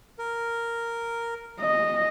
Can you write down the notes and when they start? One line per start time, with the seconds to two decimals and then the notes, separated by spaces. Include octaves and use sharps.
0.18 A#4
1.60 D#5